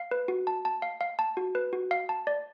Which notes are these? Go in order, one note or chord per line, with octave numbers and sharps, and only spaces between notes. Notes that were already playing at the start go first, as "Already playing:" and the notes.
Already playing: F5
B4
F#4
A5
A5
F5
F5
A5
F#4
B4
F#4
F5
A5
D5